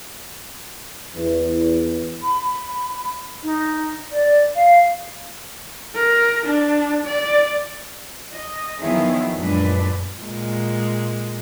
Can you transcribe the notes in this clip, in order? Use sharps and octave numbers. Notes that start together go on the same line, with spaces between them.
E2
B5
D#4
D5
F5
A#4
D4
D5
D#5
D#3 F3 F#3 B3 E4 G#4
F#2 A#2 G#3 D4 B4
A#2 G#3